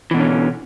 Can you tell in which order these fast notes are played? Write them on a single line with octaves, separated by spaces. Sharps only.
E3 B2 D3 C#4